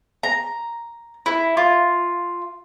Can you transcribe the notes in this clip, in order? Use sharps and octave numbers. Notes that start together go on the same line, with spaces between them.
A#5
E4
F4